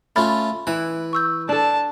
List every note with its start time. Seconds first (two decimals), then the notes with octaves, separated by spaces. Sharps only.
0.16 A3 C#4 F4 B5 F6 A6
0.67 E3 E4 B4
1.13 C#6 E6 G6
1.49 D4 A4 A5